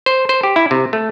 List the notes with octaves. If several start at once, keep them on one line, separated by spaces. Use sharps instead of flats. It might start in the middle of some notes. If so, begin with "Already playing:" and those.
C5
C5
G4
E4
C3
A3